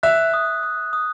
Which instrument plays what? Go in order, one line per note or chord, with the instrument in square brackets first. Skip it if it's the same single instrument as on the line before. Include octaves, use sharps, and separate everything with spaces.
[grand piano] E5 [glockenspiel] F#6
[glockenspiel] D#6
D#6
D#6